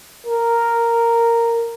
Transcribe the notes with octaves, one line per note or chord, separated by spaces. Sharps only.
A#4